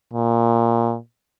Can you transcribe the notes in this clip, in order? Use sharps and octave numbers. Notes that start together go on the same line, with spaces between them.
A#2